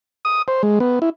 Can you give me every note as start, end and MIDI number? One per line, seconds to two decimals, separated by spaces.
0.25 0.42 87
0.48 0.62 72
0.63 0.79 56
0.80 0.99 59
1.02 1.10 64